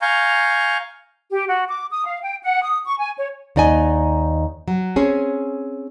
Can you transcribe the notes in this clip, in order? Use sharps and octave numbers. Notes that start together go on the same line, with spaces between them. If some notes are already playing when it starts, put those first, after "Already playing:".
F5 G#5 A#5 C#6 G6
G4
F#4
D6
D#6
F5
G5
F#5
D#6
C#6
G#5
C#5
D#2 D#4 D5 D#5 G#5
F#3
C4 C#4 G#4